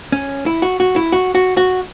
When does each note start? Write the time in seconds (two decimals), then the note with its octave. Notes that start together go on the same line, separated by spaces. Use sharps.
0.12 C#4
0.46 E4
0.62 F#4
0.80 F#4
0.96 E4
1.12 F#4
1.35 F#4
1.57 F#4